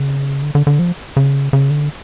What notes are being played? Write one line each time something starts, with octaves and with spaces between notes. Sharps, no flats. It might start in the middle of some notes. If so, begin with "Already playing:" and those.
Already playing: C#3
D3
D3
D3
F3
C#3
C#3
D3